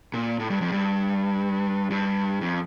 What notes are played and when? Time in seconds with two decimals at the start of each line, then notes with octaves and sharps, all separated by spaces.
0.14 A#2
0.40 A2
0.50 G2
0.61 F2
0.72 G2
1.90 G2
2.41 F2